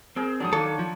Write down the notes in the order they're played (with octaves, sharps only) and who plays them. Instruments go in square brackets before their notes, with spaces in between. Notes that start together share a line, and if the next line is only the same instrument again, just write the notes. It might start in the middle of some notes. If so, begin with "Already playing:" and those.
[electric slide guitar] C4 [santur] G#4 A#4
[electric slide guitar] G#2 F3 D4 [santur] F#3 A5 D#6
[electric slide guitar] D#3 [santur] A#3 D4 C#5 [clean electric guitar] A4
[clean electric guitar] F3